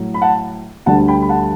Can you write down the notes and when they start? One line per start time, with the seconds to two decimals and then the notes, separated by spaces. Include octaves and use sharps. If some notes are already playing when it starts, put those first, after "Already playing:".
Already playing: A2 F#3
0.14 B5
0.22 F#5 A5
0.86 D2 D3 G3 F#5 A5
1.08 G5 B5
1.22 B5
1.29 F#5 A5